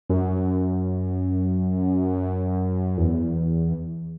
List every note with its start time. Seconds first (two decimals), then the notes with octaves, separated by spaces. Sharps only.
0.10 F#2
2.97 E2